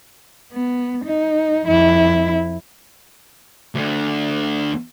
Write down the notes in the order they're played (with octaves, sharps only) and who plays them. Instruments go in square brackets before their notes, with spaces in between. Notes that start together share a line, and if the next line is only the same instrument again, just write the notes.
[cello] B3
D#4
F2 E4
[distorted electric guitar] D2 D3